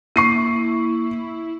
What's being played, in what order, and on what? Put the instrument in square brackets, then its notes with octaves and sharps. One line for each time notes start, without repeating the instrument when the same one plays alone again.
[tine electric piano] A#3 [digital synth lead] E4 [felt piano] C#6 C7 D#7